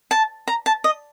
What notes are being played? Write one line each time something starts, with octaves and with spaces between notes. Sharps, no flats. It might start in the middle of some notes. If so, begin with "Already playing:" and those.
A5
A#5
A5
D#5